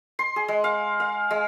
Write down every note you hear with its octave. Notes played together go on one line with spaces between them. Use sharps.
C6
G#4
G#3
F5
F5
G#3